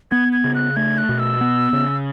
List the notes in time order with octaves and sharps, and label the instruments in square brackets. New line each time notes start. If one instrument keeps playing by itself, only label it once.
[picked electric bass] B3 [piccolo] G#6
[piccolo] G#6
[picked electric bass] C#3
[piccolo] F#6
[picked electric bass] A3 [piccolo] G#6
[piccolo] F#6
[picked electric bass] B2
[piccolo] E6
[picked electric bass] B3
C#3